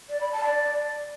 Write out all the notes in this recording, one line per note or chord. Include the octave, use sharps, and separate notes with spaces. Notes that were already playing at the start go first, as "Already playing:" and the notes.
D5
B5
A5
D5